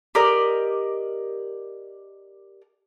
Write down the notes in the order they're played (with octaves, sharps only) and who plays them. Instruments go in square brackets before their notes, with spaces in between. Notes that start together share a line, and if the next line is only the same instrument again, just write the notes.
[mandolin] G4 A#4 D5 D#5